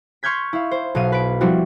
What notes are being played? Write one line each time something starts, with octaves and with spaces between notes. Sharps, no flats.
C6 C#6 F6 G6 G#6 B6
E4 F5
C5
B1 B2 F5 D#7
B4 D7
F3 G3 C4 E4 F#4